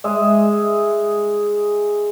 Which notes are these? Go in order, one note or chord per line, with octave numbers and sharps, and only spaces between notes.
G#3 G#4 E5